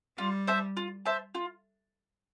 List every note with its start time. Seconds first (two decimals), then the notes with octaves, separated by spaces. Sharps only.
0.18 G3 F4
0.47 C5 E5 A5
0.77 F4
1.06 C5 E5 A5
1.35 F4